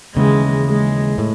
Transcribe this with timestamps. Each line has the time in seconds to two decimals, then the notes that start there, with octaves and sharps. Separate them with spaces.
0.15 D#2 C#3 E3 G#3
0.67 G#3
1.18 A2